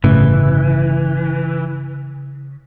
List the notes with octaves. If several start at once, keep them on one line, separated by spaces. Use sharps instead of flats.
G1 A2 C#3 E3 A3